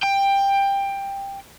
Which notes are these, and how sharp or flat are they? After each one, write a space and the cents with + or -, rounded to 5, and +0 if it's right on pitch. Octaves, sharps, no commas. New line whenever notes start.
G5 +15